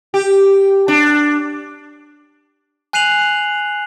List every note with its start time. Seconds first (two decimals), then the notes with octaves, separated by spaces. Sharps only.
0.14 G4
0.88 D4
2.93 G#5 F#6 C7 D#7 F7 F#7